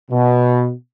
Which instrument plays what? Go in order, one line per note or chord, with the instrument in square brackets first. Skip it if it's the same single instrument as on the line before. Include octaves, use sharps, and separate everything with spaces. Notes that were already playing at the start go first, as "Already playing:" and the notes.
[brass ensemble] B2